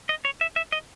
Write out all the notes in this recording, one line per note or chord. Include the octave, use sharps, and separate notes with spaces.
D#5
C#5
E5
E5
D#5